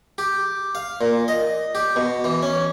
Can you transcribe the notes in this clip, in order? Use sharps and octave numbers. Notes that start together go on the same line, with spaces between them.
G4
F5
A#2
D#5
G4
B2
E3
C#4